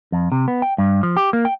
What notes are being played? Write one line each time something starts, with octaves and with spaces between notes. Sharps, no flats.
F2
C3
B3
G5
G2
F3
G4
A#3
G5